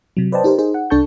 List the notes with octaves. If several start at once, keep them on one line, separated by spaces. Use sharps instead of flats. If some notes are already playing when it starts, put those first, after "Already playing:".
C3 F#3
B4 C5 D5 D#5 G5 A5
D#4 G4 A#4 C5
D#4 G#4 C5
F#5
C2 D4 A4 A5 C#6 G6